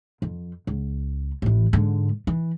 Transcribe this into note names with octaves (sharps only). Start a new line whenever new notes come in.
F2
C#2
A1 E3
G#2 D3
E3